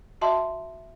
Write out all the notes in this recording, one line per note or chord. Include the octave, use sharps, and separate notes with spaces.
F#4 D#5 E5 A5 C6